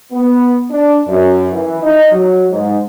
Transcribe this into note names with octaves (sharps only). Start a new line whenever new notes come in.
B3
D4
F#2
E3
D#4
F#3
G#2